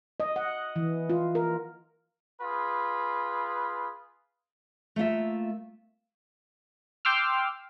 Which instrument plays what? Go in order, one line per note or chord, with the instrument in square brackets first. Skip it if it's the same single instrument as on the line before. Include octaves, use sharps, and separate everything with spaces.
[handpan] D#5
F#5
E3
F4
A#4
[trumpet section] F4 G#4 B4
[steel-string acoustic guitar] A3 A#3 F4 E5
[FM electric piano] G5 C6 D6 E6 F6